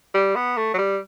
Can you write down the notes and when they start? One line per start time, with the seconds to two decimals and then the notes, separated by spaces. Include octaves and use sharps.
0.14 G3
0.36 B3
0.57 A3
0.74 F#3
0.79 G3